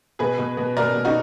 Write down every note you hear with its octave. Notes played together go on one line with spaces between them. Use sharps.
B2 G#4 B4
B2
B2
B2 A#4 D5
B2
D#4 F#4